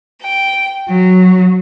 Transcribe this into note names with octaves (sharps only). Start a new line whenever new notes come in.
G5
F#3